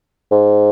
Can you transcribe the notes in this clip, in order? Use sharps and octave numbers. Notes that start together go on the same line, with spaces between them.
G#2